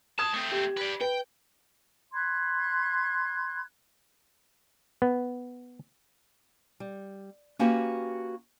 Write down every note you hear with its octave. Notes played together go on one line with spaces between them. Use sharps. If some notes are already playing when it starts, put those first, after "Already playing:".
F2 A5 D#6 G#6 E7
A3 C4
G4
B4 D5
B4 G5
B5 C6 F#6 G#6
B3
G3
A#3 C#4 F#4 G4 B4